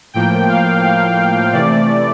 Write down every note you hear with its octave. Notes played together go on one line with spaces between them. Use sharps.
A2 F3 A#3 G5
F5
F5
C3 E3 A3 D5